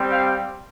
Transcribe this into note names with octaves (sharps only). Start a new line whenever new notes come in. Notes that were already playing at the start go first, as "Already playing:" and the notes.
Already playing: G3 C4 G4
F5